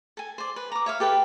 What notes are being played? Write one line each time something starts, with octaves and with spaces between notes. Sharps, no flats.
A4 G#5
C5 D5
B4
A#5 D6
C#5 E5 F5
G4 A4 B4 G5